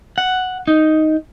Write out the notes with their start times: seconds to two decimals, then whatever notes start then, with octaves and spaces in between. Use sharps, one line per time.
0.18 F#5
0.68 D#4